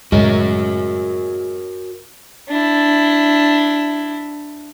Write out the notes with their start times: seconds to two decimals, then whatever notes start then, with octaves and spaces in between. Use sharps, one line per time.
0.12 F#2 A2 C#3 G#3 F#4 A#4 C#5
2.49 D4 E4